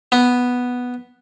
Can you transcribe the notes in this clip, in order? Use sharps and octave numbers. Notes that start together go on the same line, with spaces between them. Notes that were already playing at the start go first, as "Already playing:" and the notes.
B3